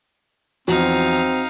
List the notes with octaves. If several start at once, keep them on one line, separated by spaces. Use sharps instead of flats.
E2 F3 C4 D#4 F#4 F5